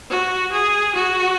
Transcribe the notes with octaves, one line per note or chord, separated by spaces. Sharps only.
F#4
G#4
F#4